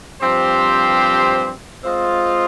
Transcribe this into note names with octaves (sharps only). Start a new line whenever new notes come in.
G2 F3 C4 G4 C5
G#3 C4 F4 C5 D#5